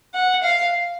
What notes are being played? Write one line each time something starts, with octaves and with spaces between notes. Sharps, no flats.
F#5
F5